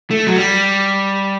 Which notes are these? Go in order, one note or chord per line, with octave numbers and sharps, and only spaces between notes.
A3
F#3
G3